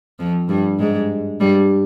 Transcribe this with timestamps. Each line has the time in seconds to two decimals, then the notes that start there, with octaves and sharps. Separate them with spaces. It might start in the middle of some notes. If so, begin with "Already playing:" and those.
0.19 F2 F3
0.49 G2 G3
0.79 G#2 G#3
1.40 G2 G3